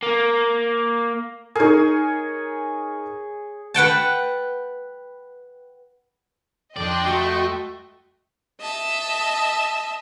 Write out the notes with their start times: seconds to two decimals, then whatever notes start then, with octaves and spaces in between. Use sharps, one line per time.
0.03 A#3
1.55 D#4 G#4 A#4 C#5
3.74 B4 F#5 G5 A5
6.76 F2 D4 D5 D#5 G5 C6
7.06 A3 F#4 A#5 D#6 A#6
8.61 D#5 E5 A5